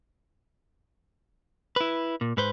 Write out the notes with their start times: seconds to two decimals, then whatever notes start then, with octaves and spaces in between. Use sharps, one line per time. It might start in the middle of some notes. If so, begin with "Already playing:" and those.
1.76 E4 B4
2.21 A#2
2.37 G#2 B4 C5